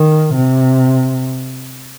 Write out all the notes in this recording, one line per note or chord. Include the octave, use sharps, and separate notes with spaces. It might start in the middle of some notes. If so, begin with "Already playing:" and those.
Already playing: D#3
C3